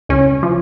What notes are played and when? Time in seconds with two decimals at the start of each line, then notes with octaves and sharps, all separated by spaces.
0.09 C#2 C#4
0.43 F3